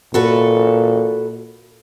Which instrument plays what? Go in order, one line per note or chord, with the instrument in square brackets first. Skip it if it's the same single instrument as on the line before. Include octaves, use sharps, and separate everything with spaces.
[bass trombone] A#2 [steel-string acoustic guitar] F#4 A4 B4